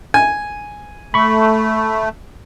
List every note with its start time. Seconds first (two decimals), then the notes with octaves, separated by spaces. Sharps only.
0.14 G#5
1.14 A3 B5 C#6